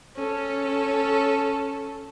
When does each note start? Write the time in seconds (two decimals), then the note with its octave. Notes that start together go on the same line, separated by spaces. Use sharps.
0.16 C#4 A4